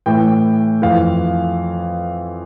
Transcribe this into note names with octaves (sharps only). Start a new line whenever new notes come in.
A2 E3 G5
F2 E3 F5